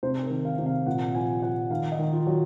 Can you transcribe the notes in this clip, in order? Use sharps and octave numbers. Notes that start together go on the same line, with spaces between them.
C3 C5
A#4
D#3
F5
C3
F5
A#2 F#5
F3 G#5
F3 F#5
D#3 F5
D#5
D#3
F4
F#3